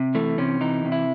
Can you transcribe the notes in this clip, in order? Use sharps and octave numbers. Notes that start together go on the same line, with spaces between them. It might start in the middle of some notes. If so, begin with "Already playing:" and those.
Already playing: C3
E3 A3
C3 C#4
E3 D#4
C3
E4